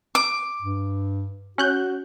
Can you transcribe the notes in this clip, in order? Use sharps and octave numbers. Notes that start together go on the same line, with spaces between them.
D6
G2
C#4 F#4 F#6 G6